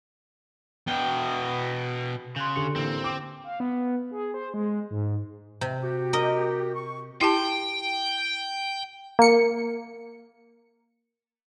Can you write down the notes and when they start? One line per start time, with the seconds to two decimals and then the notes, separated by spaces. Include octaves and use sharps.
0.87 B2 G5
2.36 C#3 C6 F#6 G6
2.56 D3 G4 C#7 F7
2.76 A1 A#3 C4
3.04 G5 D6
3.44 F5
3.60 B3
4.11 G#4
4.34 C5
4.54 G#3
4.91 G#2
5.61 C3
5.81 F#4 G4
6.13 A#4 D#5
6.74 C#6
7.21 E4 G4 G5 A5
9.19 A#3 C#7